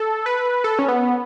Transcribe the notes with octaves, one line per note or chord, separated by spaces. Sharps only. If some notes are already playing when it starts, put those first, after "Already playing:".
Already playing: A4
B4
A4
C#4
B3